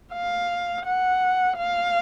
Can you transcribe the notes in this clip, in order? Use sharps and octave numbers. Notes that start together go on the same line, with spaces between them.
F5
F#5
F5